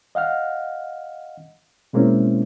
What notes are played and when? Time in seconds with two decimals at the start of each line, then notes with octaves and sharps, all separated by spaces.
0.15 D#5 F5 F#5 F6
1.93 B2 G#3 A#3 C4 C#4 E4